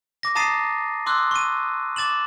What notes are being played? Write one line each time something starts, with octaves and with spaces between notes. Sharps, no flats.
D6 A#6
A5 A#5 D#6 A6 C7 D#7
C6 D6 E6 F#6
C#6 D#7
D6 A6 E7 F#7